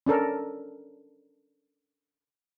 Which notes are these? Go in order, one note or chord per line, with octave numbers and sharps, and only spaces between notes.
C#4 D4 A4 A#4